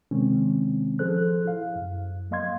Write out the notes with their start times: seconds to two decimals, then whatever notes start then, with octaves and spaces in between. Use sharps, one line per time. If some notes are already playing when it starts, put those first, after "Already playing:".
0.11 C3 D#3 G#3 C4 C#4
0.99 F3 G#4 A4 C5 F#6
1.45 E4 F5
1.76 F#2
2.31 F#3 A#3 D#5 F5 C6 G#6